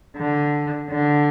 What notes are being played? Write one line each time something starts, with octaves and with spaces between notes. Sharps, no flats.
D3
D3